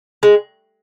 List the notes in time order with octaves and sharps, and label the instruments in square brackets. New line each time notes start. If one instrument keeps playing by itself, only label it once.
[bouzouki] G#3